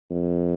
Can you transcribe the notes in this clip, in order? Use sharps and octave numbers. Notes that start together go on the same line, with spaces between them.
F2